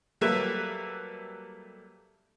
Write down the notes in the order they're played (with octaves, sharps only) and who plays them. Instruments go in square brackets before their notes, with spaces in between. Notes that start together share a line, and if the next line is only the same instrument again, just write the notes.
[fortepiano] F#3 G3 A3 A#3 B4 E5